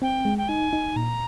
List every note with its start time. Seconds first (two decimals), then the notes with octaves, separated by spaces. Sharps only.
0.02 C4 G5
0.25 G#3
0.38 G5
0.48 D#4 G#5
0.73 D#4
0.96 A#2 A#5